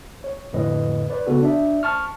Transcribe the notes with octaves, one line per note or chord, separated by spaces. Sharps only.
C#5
F2 A2 D3 B4 D#5
B4 D5
C#2 C#3 B3 F#4 A4
D4 D5 E5
A5 C#6 F6